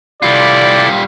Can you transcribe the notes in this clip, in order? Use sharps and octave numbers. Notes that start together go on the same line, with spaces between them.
C3 G3 E4 F4 A4 D5